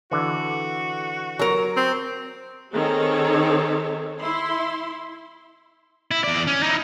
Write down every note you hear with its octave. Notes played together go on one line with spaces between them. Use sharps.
D3 E3 F#4
F#3 A#4
C4
D#3 C4 G#4 A4 C#5
E4 C6
E4
E2 D5
C#4
D#4 E4